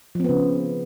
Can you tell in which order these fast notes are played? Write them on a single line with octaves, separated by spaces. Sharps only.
F3 C4 B3 C#3